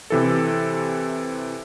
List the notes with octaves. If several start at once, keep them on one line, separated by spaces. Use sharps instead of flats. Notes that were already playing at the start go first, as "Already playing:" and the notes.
C3 E3 A4